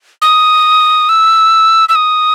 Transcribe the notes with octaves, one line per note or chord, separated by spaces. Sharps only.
D#6
E6
E6
D#6